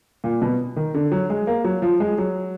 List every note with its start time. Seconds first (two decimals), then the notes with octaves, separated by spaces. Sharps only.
0.24 A#2
0.42 B2
0.76 D#3
0.94 D3
1.12 F#3
1.30 G#3
1.47 A#3
1.64 F#3
1.82 F3
2.00 G#3
2.18 F#3